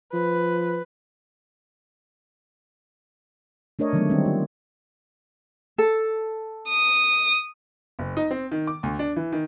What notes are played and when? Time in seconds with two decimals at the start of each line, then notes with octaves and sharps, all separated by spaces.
0.13 F3 B4
3.79 A3 D4 A#4 C#5 D#5
3.93 D3 D#3 F#3 G#3 A3 B3
4.10 D#3 G3 C4 D4
4.26 F4
5.78 A4
6.69 D#6
7.99 F#1
8.17 D#4
8.31 C4
8.51 D#3
8.67 D6
8.83 D2
8.99 D4
9.16 E3
9.32 D#3